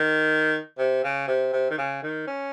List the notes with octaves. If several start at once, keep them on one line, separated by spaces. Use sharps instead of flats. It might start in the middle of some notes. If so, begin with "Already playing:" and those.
Already playing: D#3
C3
C#3
C3
C3
D#3
C#3
D#3
C#4